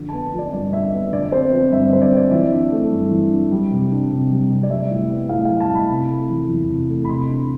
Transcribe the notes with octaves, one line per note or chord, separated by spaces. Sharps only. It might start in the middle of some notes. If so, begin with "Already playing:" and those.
Already playing: F2 D3
A5
B3
F3 D5
G2 D5
D3 E5
B3
D3 D5
C4 C5
F3
G2 E5
D3 C5
D5
C4 D5
E3 E5
D4
A3
G2
E3
D4
G3
C3
D4
C3
G3
C3
D5
G3 E5
A2
B3
A2 F5
F5
G3
A5
A2
B5
C3
A3
E3
E2
C3
A3
B5
C3 C6
D4